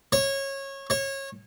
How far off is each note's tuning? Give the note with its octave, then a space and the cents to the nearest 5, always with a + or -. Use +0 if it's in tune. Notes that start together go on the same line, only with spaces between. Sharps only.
C#5 -20
C#5 -25